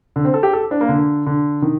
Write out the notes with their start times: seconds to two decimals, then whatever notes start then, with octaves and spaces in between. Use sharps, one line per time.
0.16 D3
0.25 C4
0.34 A4
0.43 G4
0.53 A4
0.71 D4
0.81 A#3
0.89 D3
1.26 D3
1.62 D#3